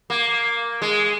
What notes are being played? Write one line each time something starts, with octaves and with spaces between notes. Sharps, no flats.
A#3
G#3